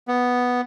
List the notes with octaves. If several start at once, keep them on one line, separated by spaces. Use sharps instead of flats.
B3